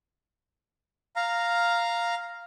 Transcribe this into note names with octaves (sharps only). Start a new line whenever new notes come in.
F5 A#5